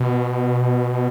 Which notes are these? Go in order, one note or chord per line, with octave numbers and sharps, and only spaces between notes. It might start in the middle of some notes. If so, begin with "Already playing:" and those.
Already playing: B2